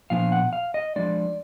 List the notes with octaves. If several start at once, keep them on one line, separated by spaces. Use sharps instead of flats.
A#2 F3 B3 D4 F5
F#5
F5
D#5
F3 G#3 D4 D5